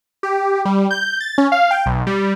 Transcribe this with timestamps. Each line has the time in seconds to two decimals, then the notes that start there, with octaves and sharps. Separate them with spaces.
0.23 G4
0.65 G3
0.91 G6
1.20 A6
1.38 C#4
1.52 F5
1.71 G5
1.86 B1
2.07 G3